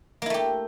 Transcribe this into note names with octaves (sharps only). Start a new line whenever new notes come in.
A3 A#3 E4 G4